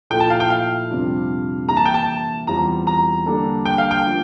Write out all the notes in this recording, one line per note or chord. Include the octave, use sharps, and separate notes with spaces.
A#2 F3 A3 E4 A4 G5
A5
F5
G5
F5
F2 C3 G3 D4 F4
E3 A#3 E4 G4 A#5
A5
G5
A5
E2 E3 G3 C4 F4 A#5
A#5
D3 G3 A#3 D4 A4
G5
F5
G5
F3 A#3 D4